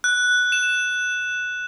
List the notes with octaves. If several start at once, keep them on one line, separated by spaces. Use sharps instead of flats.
F#6
E7